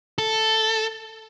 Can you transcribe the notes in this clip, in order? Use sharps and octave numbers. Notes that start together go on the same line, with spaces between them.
A4